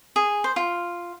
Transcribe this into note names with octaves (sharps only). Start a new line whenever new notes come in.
G#4
C5
F4